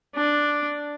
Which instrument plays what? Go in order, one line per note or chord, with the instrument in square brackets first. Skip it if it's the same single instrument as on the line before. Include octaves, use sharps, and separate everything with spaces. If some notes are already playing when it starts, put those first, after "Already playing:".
[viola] D4